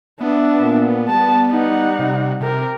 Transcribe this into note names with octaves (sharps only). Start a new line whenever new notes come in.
B3 D4 E5
A#2
G3 A5
D#4 F#5
C3
C3 G4 A#4